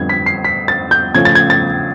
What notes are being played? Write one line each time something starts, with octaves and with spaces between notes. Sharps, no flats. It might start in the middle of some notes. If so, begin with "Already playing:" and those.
Already playing: F2 D3 G3 B3 G#6
B6
C7
B6
A6
G6
C#3 F3 A3 C#4 G#6
A6
G#6
A6